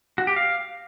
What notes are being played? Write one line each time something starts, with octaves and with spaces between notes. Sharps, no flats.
F#4
G4
F5